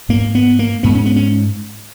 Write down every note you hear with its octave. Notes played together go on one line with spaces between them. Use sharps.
G#2 A#3
B3
A#3
G#2 B3
C#4
B3
C#4